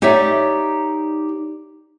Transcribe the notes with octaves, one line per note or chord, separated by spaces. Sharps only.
D#4 G4 C#5 D5 E5